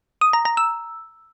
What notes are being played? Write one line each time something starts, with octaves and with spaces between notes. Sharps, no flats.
D#6
A#5
A#5
E6